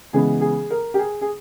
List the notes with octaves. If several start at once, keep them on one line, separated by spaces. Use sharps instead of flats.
C#3 E3 G#3 B3 G#4
G#4
A#4
G4
G#4
G#4